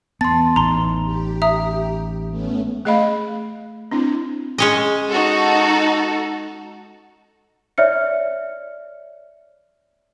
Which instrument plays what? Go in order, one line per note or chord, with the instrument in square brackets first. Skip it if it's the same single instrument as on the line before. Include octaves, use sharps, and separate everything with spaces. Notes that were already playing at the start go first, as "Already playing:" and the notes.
[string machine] E2 [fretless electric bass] B3 [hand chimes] A5 C6 [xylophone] A6
[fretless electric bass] A1 [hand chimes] D#4 [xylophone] A#5 C6
[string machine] G4
[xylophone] E5 A#5 D#6
[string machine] A3 B3 C#4
[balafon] A3 G#4 D#5 F5 B5
C4 D4 E4
[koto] G#3 C#4 D#5
[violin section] D#4 F#4 A4
[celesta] C#5 D5 E5 F6 C#7